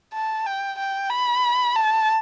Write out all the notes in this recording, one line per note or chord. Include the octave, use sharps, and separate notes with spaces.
A5
G5
G5
B5
A5